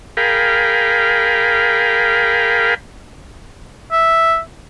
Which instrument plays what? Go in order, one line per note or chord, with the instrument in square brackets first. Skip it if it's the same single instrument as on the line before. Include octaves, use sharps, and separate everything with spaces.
[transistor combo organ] G#4 A#4 F5 G5 B5
[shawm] E5